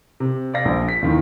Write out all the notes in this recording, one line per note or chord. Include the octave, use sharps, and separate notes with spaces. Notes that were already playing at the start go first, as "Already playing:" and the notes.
C3
D5 F5 A#6
A#1
B6
D#2 D#3 E3